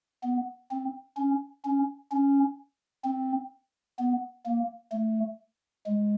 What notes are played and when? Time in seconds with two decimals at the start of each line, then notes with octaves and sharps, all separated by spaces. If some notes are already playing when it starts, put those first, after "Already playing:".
0.23 B3
0.71 C4
1.17 C#4
1.65 C#4
2.12 C#4
3.04 C4
3.99 B3
4.46 A#3
4.92 A3
5.86 G#3